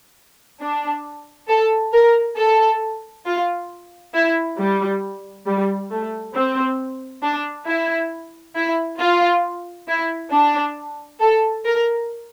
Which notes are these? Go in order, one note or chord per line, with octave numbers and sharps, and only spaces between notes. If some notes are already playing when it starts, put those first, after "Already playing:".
D4
A4
A#4
A4
F4
E4
G3
G3
A3
C4
D4
E4
E4
F4
E4
D4
A4
A#4